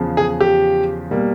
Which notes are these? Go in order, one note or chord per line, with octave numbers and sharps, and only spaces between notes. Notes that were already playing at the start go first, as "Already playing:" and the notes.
Already playing: E2 C#3 F3
G#4
G4
B2 G3 A#3